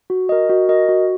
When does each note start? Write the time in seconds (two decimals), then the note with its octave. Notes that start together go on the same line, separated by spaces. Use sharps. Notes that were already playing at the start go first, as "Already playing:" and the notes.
0.10 F#4
0.29 A#4 D#5
0.49 F#4
0.69 A#4 D#5
0.89 F#4